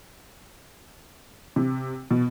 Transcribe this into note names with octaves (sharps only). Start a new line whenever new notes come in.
C3
B2